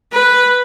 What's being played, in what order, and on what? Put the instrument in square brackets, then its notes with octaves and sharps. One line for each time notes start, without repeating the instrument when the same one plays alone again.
[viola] B4